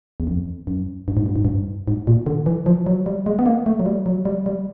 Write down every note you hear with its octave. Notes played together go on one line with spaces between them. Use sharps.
E2
F2
F#2
G2
G#2
G2
G#2
G2
G#2
A#2
D3
E3
F3
F#3
G3
G#3
B3
A#3
A3
F#3
G3
F#3
G3
G3